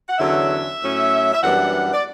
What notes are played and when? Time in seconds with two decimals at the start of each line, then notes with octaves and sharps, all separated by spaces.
0.07 F#5
0.18 E2 D3 F#3 C#4 E5
0.81 A2 F#3 C#4
1.33 E5
1.42 F#2 E3 G3 B3 D4 F#5
1.94 D5